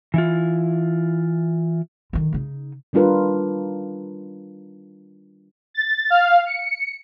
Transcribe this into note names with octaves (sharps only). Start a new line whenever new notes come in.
E3 E4 F4
D3 D#3
C#3 D#4
D#3 G3 D4 F4 A#4 B4
A6
F5
C#7